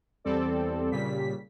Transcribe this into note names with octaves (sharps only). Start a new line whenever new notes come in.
E2 G3 C4 A4 D5
A#2 C#3 G3 B6